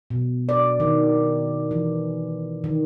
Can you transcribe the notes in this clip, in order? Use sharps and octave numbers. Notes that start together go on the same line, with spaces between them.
B2
D5
D#3
E3
D#3